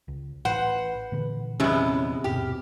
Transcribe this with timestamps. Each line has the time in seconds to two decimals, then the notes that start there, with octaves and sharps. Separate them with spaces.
0.08 C#2
0.45 A1 B4 C5 F#5
1.12 A#2 D3 E3
1.60 E2 C3 G#3 B3 C#4
2.24 D#1 G2 B2 G4 F6